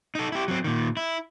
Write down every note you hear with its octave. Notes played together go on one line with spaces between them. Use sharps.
D#4 A4
E4 G4
F#3 C4
A#2 D#3
E4